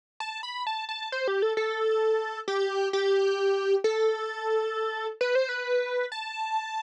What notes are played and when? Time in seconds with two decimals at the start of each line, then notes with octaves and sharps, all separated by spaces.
0.20 A5
0.43 B5
0.67 A5
0.89 A5
1.12 C5
1.28 G4
1.42 A4
1.57 A4
2.48 G4
2.93 G4
3.84 A4
5.21 B4
5.35 C5
5.49 B4
6.12 A5